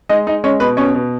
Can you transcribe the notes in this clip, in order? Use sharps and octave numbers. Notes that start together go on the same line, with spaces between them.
G#3 D#4 D#5
G#3 D#4 D#5
G#3 C#4 C#5
B2 B4
B2 C#4 C#5
B2